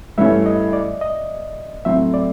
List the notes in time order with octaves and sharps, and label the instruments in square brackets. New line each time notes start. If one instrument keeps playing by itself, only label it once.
[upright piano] G2 E3 A3 C#4 [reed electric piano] E5
[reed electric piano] D#5
D5
D#5
[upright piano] A2 F#3 A3 C4 [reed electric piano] E5
[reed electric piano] D5